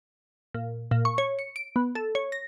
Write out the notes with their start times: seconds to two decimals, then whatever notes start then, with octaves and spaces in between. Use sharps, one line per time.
0.54 A#2
0.91 A#2
1.05 C#6
1.18 C#5
1.39 C#7
1.56 D7
1.76 B3
1.95 A4
2.15 C#5
2.32 A#6